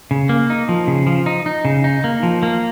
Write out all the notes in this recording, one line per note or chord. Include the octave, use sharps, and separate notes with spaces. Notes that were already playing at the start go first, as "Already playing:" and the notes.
C#3
A#3
D#4
F3
C#3
F3
D#4
D#4
C#3
D#4
A#3
F3
A#3